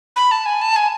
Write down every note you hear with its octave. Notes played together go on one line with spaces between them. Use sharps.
B5
A5
G#5
A5
G#5